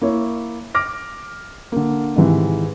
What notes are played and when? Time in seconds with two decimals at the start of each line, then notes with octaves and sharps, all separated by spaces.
0.01 A#3 E4 C#5
0.75 D6 F6 A#6
1.72 D3 A#3
2.16 G#2 C3 D#3 E3 G#3